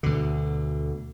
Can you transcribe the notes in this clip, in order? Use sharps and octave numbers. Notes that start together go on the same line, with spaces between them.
D2 B2 D3